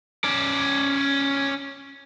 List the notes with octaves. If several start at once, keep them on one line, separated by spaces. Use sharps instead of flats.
C#4 D5